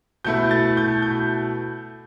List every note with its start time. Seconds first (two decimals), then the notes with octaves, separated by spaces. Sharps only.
0.25 B2 A3 E4 G6
0.51 A6
0.77 G6
1.02 G6